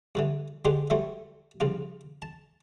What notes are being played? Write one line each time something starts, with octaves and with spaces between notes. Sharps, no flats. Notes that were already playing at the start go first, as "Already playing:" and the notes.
G2 D3 E3
D3 G#3 D#4 G4 B4 C5
E3 F#3 G3 A3 F#4 C5
C2 C#3 F3 F4
A5